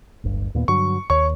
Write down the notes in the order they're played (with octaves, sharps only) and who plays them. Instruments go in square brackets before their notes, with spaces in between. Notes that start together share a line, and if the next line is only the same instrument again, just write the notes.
[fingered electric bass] D1 G1 G2
D#2 A#2 B3
[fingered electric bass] G2 D3 F#3 [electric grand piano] C#6
[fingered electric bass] D#2 [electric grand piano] C#5 C#6